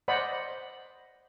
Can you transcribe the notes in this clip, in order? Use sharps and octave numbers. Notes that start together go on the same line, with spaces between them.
C5 D5 D#5 F#5 B5